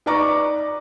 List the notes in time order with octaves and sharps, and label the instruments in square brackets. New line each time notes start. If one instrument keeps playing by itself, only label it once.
[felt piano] D#4 B4 D5 A#5 C#6 D6